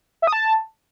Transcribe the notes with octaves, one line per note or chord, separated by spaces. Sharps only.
E5
D#6
A5